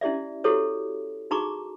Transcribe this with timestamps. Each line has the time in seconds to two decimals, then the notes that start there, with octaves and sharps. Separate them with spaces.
0.01 C#4 E4 G4 D5 E5
0.44 E4 F#4 G4 A4 C#5
1.31 D#4 F#4 G#4 A#5 C#6 D6